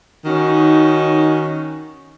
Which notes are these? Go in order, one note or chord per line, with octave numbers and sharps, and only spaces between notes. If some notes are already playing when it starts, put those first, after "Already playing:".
D#3 C#4 D#4 F#4